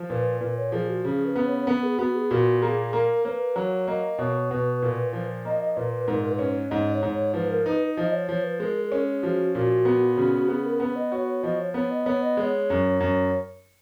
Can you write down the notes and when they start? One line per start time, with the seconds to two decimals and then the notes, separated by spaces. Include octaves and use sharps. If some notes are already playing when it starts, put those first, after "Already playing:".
Already playing: F3
0.10 A#2 B4
0.41 A#2 B4
0.57 C#5
0.72 F3 G#4
0.89 F#4
1.04 C#3 G#4
1.25 B4
1.36 B3
1.46 C#5
1.59 C#5
1.67 B3 B4
1.83 G#4
1.98 B3 F#4
2.15 G#4
2.30 A#2 F#4
2.62 A#3 G#4
2.93 A#3 A#4
3.25 A#3 C#5
3.29 B4
3.56 F#3 C#5
3.88 A#3 D#5
4.18 B2 C#5
4.50 B2 B4
4.82 A#2
5.13 F3
5.45 A#3 D#5
5.61 D#5
5.77 A#2 B4
5.92 B4
6.08 G#2 A#4
6.20 A#4
6.29 B4
6.39 C#4
6.50 C#5
6.70 G#2 D#5
6.92 C#5
7.03 G#2
7.13 C#5
7.34 F3 B4
7.49 A#4
7.66 D#4 B4
7.97 F3 D#5
8.13 C#5
8.28 F3 C#5
8.44 B4
8.60 G#3 A#4
8.81 A#4
8.92 C#4
9.02 G#4
9.23 F3 F#4
9.54 A#2 F#4
9.85 B3
10.17 C#3
10.48 B3 G#4
10.64 A#4
10.80 B3 B4
10.96 D#5
11.12 F#4 C#5
11.27 C#5
11.43 F3 D#5
11.59 C#5
11.74 B3 C#5
11.91 D#5
12.06 B3 C#5
12.22 D#5
12.37 G#3 D#5
12.42 C#5
12.70 F#2
13.00 F#2